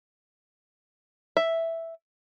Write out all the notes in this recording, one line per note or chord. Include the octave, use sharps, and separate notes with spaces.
E5